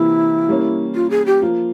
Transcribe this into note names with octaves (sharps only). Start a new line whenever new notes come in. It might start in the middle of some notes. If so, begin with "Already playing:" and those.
Already playing: C3 E3 A#3 E4 F4
G3 A#3 C#4
F4
G#4
G4
F3 A#3 F4